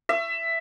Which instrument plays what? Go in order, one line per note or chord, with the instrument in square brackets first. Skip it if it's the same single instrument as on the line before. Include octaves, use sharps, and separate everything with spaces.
[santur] E5